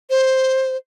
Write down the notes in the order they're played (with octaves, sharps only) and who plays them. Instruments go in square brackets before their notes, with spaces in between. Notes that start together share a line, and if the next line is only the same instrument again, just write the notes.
[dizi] C5